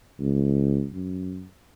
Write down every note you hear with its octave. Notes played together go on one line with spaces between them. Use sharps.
C#2
F#2